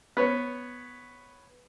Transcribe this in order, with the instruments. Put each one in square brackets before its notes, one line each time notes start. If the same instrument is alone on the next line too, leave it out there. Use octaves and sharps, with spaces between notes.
[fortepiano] B3 C#5